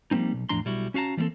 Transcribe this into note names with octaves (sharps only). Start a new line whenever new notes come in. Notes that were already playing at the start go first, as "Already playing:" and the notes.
F3 G3 A#3 C4 D#4
B1
E2 A2 F3 D4 A#5 C6
B1 G3 E4 F#4
C#4 F#4 F5 A5 A#5
E3 G3 A#3 C4 A4